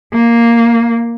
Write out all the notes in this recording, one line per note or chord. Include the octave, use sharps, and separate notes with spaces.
A#3